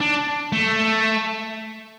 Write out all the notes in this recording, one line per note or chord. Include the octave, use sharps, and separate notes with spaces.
D4
A3